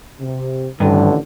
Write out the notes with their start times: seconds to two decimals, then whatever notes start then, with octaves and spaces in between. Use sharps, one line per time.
0.20 C3
0.80 A1 G2 D3 D#3